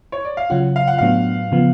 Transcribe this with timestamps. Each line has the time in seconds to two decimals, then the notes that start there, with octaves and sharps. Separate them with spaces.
0.12 C#5
0.25 D5
0.37 F5
0.50 C#3 F#3 C#4 F4 F#5
0.76 F5
0.88 F#5
0.98 A2 F#3 B3 D4 F5
1.52 C#3 F3 B3